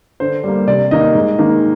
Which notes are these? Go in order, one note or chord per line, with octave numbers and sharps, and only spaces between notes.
D3 C5
G3 A#3
C3 D5
D#3 A#3 D#5
G#2
D#3 A#3